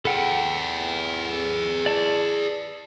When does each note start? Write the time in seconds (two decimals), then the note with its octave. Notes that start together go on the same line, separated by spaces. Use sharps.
0.05 G#4 A4 B4 F#5 G5
1.86 D5 A5